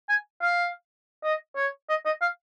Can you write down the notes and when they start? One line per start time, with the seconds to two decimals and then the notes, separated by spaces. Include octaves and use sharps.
0.09 G#5
0.42 F5
1.24 D#5
1.56 C#5
1.90 D#5
2.06 D#5
2.22 F5